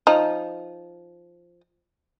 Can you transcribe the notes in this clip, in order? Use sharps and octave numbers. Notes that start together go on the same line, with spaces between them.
F3 D#4